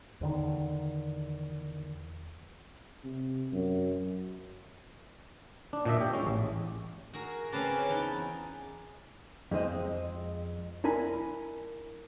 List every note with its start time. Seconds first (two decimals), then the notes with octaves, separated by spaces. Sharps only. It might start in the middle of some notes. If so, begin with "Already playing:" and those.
0.21 E2 D3 D#3
3.04 C3
3.52 F#2
5.73 D4
5.85 A#2 D4 D#5 E5
6.01 G4
6.13 G#3 C#4
6.27 A1
7.13 F#4 G#4 A#4
7.52 C#3 C4 C#4 B4 G#5 A5 D6
7.86 E2 D#4
9.51 F2 G#3 C4 D#5
10.84 D4 E4 A#4 G#5 B5